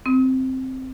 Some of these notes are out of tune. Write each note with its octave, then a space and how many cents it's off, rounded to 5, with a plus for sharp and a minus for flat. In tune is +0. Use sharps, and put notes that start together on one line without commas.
C4 +0 D#6 +45